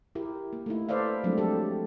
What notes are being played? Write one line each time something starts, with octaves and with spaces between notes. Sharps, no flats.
E4 G4 A#4
A#3
A3 D#4 E4
A4 B4 C5 D5 E5 F5
F3 F#3 G#3 A3 C4 D4
F#3 G4 A4